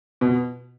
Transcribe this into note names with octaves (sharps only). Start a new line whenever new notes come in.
B2